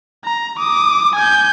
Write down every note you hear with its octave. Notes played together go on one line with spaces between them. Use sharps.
A#5
D6 D#6
G#5 G6